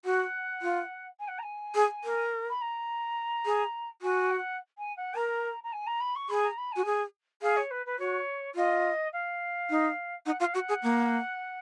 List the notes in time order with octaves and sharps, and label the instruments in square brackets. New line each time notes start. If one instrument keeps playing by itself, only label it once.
[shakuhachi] F#4 [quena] F#5
[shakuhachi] F4
[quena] G#5
F#5
A#5
G#5
[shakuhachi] G#4
A#4
[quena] B5
A#5
[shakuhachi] G#4
[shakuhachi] F#4 [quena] G#5
[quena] F#5
G#5
F#5
[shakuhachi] A#4 [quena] A#5
[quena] A#5
G#5
A#5
B5
C#6
[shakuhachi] G#4 [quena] B5
[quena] A#5
B5
[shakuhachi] F#4 [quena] G#5
[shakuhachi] G#4
[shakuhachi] G#4 [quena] F5
[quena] C#5
B4
B4
[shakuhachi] F#4 [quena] C#5
[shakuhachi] F4 [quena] D#5
[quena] F5
[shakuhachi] D#4
[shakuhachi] D#4 [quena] F#5
[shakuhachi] F4 [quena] F5
[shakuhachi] F#4 [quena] F#5
[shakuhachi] G#4
A#3